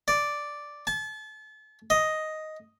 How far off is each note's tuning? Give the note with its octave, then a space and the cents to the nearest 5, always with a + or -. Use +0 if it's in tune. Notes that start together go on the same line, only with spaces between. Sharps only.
D5 +0
A5 -35
D#5 +5